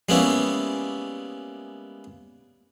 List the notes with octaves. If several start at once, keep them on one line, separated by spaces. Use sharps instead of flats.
G3 G#3 A#3 B3 C#4 E4